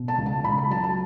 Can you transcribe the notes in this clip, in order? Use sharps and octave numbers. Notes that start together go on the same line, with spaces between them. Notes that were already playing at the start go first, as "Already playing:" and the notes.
Already playing: B2
A5
C#2
A5
C#2 B5
B5
F#3 A5
A5